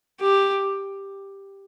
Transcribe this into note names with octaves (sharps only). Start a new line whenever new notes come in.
G4